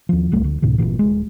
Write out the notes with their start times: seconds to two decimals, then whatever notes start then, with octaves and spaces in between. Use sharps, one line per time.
0.09 D#2 F3
0.32 D1 C#2 G3 A3
0.44 D2
0.62 D2 A2 C3 D#3
0.78 G1 C#2 A#2 E3
0.99 D1 G#3